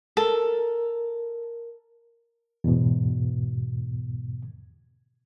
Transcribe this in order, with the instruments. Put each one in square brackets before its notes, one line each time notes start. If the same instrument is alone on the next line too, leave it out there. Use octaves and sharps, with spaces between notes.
[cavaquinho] A4 [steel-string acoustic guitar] A#4
[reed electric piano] E2 G#2 B2